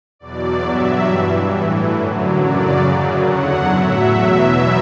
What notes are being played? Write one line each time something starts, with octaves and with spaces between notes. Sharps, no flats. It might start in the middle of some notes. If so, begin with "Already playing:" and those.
E2 B2 F#3 D5
G2 F#3 E5
G2 E3
A2 E3
F#2 D3 F#3
F#2 C#3 F#3 D5
F#2 C#3 F#3
E2 D3 F#3 F#5
A2 F#3 E5
E2 B2 F#3 E5